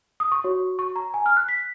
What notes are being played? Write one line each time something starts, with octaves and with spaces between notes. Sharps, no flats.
D#6
C#6
F#4 C#5
C#6
A#5
G#5
F6
F#6
B6